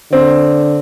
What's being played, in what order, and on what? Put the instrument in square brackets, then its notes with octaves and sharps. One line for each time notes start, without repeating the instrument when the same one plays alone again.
[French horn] D3 [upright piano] C4